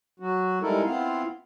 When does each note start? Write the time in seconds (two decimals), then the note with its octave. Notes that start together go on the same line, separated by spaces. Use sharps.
0.20 F#3 F#4
0.61 G3 G#3 D#4 E4 A4 A#4
0.84 B3 C4 E4 F4 F5